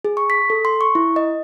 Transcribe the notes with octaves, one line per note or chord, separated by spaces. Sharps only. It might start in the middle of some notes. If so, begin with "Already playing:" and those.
G#4
C#6
B6
A4
C6
C#6
E4
D#5